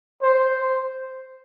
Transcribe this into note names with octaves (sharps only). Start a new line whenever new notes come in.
C5